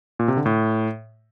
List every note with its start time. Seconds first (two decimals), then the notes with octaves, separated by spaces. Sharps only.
0.19 A#2
0.28 C3
0.37 D3
0.46 A2